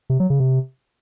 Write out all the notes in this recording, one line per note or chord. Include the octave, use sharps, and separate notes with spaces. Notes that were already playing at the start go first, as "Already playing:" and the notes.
C3
F#3
C#3
C3